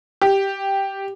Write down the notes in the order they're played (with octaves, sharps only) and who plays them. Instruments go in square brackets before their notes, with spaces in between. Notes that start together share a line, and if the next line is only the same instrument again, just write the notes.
[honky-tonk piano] G4